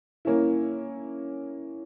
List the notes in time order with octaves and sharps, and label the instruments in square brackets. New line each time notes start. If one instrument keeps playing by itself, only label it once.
[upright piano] A#3 C#4 E4